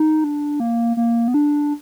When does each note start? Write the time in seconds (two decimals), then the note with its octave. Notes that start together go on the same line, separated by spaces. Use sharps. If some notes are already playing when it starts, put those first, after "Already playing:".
Already playing: D#4
0.24 D4
0.60 A#3
0.97 A#3
1.28 B3
1.34 D4